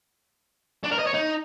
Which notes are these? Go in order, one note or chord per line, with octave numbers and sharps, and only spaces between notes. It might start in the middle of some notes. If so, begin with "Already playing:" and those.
D4
A#4
D#5
C#5
D#4